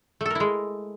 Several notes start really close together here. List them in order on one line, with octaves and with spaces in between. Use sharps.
A3 A4 A#4 E4 G#3